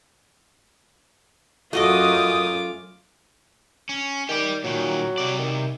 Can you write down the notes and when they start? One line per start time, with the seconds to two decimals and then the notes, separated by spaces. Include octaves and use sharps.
1.73 F#2 A3 F4 F#4 D#5 D6 D#6
3.89 C#4
4.29 D#3 G4 D5
4.64 A#2 D#3 F#3
5.18 C3 D5
5.39 D#3